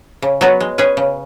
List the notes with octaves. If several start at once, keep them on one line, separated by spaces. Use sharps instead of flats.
C#3
F#3 B3 F#4 B4
G#3
C#4 G#4 B4
C#3